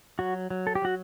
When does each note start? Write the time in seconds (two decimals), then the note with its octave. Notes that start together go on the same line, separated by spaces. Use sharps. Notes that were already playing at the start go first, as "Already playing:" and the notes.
0.19 F#3 F#4
0.50 F#3
0.67 A4
0.75 G4
0.82 F#3 F#4